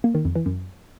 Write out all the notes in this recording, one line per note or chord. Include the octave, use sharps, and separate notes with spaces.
A#3
D#3
F2
E3
F#2